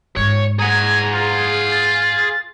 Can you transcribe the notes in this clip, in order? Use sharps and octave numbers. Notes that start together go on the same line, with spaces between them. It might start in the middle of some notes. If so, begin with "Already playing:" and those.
G#2 C#5
G#4 F#5 G#5 A#5
F4
A6